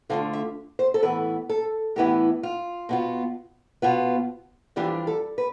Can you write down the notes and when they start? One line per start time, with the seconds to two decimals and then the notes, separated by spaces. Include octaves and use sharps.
0.09 D2 D3 A3 D4 F4 F5
0.33 E5
0.79 C5
0.94 A4
1.02 A2 E3 B3 E4 B4
1.49 A4
1.96 A2 E3 B3 E4 G4
2.43 F4
2.89 B2 B3 F4
3.82 B2 B3 F4
4.76 F2 E3 G3 D4 F4 G4
5.07 A4
5.38 B4